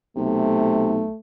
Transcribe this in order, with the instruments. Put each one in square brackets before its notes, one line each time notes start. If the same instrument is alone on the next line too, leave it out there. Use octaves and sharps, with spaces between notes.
[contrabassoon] B1 [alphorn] C3 [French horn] A3